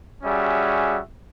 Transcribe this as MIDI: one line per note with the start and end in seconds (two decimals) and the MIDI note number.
0.23 1.00 55
0.23 1.00 61
0.23 1.00 66
0.23 1.00 68
0.23 1.00 76